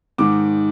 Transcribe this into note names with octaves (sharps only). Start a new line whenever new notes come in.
G#2 D#3 D6